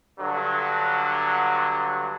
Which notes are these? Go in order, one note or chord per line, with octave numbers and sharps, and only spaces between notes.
G2 D3 F#3